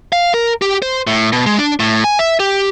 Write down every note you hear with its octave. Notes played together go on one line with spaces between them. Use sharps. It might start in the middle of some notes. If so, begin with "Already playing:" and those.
F5
A#4
G4
C5
A2
B2
G#3
D4
A2
G#5
E5
G4